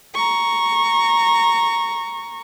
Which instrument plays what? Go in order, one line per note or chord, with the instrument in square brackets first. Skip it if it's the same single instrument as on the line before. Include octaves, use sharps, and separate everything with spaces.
[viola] A#5 C#6